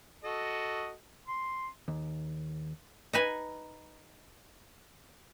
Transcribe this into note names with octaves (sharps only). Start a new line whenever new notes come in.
F#4 A4 D#5
C6
D#2
D#4 B4 G#5